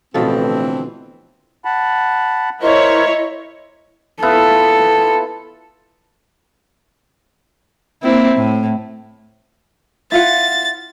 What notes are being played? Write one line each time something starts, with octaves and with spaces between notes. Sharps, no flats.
A1 B2 D3 E3 F3 C4 A4
F#5 A5 B5
E4 A#4 C5 C#5 D#5
B3 E4 F4 A4
A#3 C4 E4
A2
E4 F4 F#5 A6